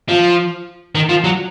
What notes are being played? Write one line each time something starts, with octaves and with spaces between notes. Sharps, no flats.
F3
D#3
F3
F#3